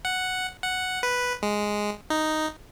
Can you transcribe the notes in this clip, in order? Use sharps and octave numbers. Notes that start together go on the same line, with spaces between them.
F#5
F#5
B4
G#3
D#4